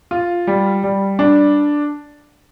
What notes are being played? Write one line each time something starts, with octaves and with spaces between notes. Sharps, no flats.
F4
G3
G3
D4